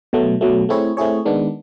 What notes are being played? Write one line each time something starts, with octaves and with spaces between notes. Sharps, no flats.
B2 F#3 A3
B2 F#3 A3
A3 C4 E4 G#4 C#5
A3 C4 E4 G#4 C#5
D#3 G#3 B3 D4